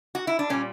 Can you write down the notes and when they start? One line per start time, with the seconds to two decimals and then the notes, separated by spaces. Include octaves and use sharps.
0.15 F#4
0.27 E4
0.39 D4
0.50 A#2 G3 C#4